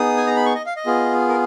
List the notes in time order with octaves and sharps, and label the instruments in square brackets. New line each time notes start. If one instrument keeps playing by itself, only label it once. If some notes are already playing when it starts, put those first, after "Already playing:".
Already playing: [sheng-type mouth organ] B3 D#4 G#4 D#6
G#5
A#5
B5
C#6
D#5
F5
D#5
B3 F4 G#4
A#4